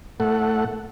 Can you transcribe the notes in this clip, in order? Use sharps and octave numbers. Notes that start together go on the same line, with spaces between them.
A2 A3 A4 F#5